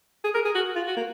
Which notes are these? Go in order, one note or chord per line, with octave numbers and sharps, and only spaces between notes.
G#4
A#4
G#4
F#4
F4
F#4
A#3